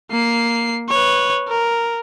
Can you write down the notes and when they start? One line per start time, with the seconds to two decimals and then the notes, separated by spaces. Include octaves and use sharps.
0.11 A#3 C7
0.89 B4 C#5
1.48 A#4